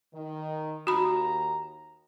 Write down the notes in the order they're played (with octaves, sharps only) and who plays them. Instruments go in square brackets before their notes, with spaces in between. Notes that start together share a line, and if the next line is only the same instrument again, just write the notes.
[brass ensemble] D#3
[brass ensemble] D#2 A#5 [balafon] F#4 B5